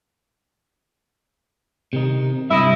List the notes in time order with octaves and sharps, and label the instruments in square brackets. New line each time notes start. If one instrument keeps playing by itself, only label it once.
[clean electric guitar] C3 D#3 D#4
[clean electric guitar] G2 C3 [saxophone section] E4 D#5 E5